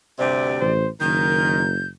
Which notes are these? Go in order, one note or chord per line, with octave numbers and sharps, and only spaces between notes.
D2 G2 C3 C5 D5
A1 C5
F#1 D#3 A#4 G6